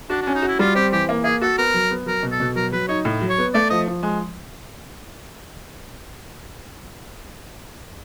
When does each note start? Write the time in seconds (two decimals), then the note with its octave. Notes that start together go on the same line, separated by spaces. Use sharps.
0.10 D4 F#4
0.22 D4
0.27 C#4
0.34 D#4
0.42 F#4
0.48 E4
0.59 G3 F4
0.75 C4 G4
0.92 E3 G4
1.09 A#3
1.24 A#3 G#4
1.41 F#4 A4
1.58 B3 A#4
1.74 F#3
1.91 B3
2.06 F#3 A#4
2.23 B2
2.32 A4
2.40 B2
2.55 F#3 A#4
2.72 F#3 B4
2.88 D#4 C#5
3.05 A2
3.21 F#3
3.29 C#5
3.38 B3
3.54 A3 D5
3.70 F3 D#5
3.88 F3
4.03 G#3